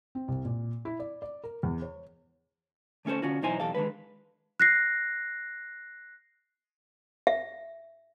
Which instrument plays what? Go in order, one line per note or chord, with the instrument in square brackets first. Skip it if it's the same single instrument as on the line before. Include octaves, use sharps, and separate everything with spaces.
[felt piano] C4
C2
A#2
E4
D5
D5
A#4
E2
C#5
[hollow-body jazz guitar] D3 A3 C#4 A4 C5
D3 C#4 F4 F#4
B1 E2 D#4 E4 C5 G#5
B1 E2 G4 A4 F5
D3 D#3 G#3 B4
[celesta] F#6 A#6 C7
[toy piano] E5